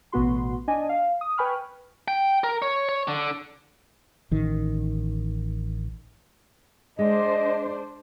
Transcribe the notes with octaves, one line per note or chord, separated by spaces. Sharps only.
A1 B2 B3 F#4 C6
D4 D#5 G#5
F5
D#6
B4 G5 G#5 B5 C#6 F6
G5
A#4
C#5
C#5
D3
A1 D#3
G#3 D4 C5 D#5